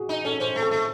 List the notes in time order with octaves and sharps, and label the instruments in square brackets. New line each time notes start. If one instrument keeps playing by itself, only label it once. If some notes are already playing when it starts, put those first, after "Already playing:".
Already playing: [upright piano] F#4 G#4
[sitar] D#4
[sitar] C#4 [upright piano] A4
[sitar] C#4 [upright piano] C5
[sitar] A3
[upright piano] A4
[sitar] A3